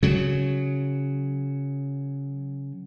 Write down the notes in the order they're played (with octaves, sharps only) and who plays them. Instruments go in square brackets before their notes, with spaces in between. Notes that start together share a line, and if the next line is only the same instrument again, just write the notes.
[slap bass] C#3 F#3